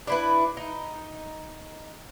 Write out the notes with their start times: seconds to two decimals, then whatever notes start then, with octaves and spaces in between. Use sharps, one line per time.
0.07 D4 E4 B4
0.57 D#4